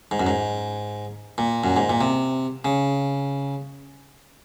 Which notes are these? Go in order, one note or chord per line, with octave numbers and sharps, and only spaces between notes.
G#2
F#2
G#2
A#2
F#2
G#2
A#2
C3
C#3